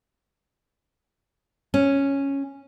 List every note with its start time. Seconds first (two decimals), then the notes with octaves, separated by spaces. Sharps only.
1.74 C#4